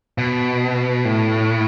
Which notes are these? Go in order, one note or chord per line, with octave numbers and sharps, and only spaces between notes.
B2
A2